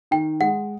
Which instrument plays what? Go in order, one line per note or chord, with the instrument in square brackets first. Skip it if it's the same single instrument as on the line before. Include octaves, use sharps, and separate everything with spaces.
[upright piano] D#3 [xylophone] G5
[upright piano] G#3 [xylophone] F#5